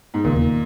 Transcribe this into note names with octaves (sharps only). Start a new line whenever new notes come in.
G#2
E1 D#2 A#2 C#3